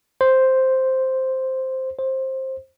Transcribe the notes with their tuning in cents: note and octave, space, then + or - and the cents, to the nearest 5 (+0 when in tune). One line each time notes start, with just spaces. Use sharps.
C5 +0
C5 +15